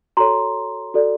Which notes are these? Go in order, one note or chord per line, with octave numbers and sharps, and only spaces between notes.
F#4 A4 C#5 A#5 C6
F#4 A4 D5